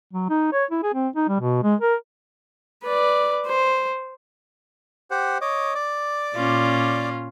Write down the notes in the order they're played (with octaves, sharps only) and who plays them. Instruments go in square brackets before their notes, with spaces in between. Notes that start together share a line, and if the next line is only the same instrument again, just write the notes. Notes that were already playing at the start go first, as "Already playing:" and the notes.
[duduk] F#3
D#4
C#5
E4
G#4
C4
D#4
G3
B2
G#3
A#4
[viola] B4 D5
C5
[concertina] G4 C5 F#5
C#5 D#5 D6
D5 D6
[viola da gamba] A#2 C#4 F4